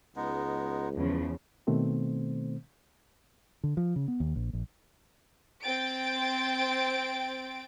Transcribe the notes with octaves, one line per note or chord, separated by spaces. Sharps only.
C#2 G#3 B3 D#4
E2 C#3 F3
B2 D#3 A3 C4 C5
D3
F3
C#3
B3
D#2
A#1
A#1
C4 G5 A6 D7